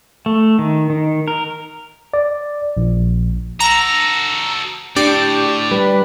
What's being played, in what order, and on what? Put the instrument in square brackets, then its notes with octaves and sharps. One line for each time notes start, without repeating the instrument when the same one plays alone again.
[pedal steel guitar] A3
D#3
D#3
A#4
[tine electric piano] D5
A#1
[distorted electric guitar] F#4 A4 [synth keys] A#5
[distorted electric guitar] A2 [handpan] D4 [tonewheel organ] G4 [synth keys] D5
[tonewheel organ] G3 B4